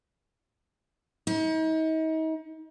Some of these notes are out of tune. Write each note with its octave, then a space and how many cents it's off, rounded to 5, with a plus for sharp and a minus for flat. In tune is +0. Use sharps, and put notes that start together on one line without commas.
D#4 +40